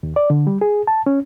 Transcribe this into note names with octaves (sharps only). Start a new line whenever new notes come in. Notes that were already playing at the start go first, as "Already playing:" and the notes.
D#2
D5
D3
G3
G#4
A5
C#4